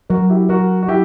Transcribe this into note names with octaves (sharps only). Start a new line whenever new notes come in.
F#3 F#4 A#4
E4 G4
F#3 F#4 A#4
F#4
F#3 E4 G4